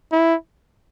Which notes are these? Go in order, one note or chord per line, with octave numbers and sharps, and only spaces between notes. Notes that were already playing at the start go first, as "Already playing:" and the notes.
E4